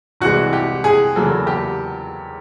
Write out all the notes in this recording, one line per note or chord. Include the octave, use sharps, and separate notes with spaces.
C2 C3 E3 G#3 F#4
G4
G#4
E2 C#3 F#3 A#3 A4
G4